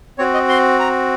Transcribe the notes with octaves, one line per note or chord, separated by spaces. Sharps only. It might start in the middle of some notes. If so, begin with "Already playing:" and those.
C4 F#4 C#5
D#5
C6
A#5